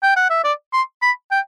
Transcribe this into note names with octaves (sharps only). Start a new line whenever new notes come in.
G5
F#5
E5
D5
C6
B5
G5